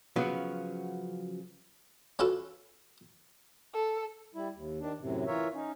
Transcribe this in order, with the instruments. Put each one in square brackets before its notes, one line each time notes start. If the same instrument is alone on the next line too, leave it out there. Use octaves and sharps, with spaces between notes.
[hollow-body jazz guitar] C#3 F3 F#3 B3 C#4 F#4
[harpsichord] C#4 F4 F#4 A4 B4
[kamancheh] A4
[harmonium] G3 E4
D#2
D#3 D4
F#2 A2 C3
E3 F4 A#4 C#5 E5
C#4 D#4